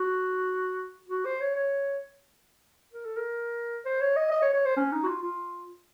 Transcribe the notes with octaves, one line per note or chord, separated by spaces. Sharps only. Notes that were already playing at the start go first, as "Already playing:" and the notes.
Already playing: F#4
F#4
C5
C#5
C#5
A#4
A4
A#4
C5
C#5
D#5
D#5
C#5
C#5
C5
C#4
D#4
F#4
F4
F4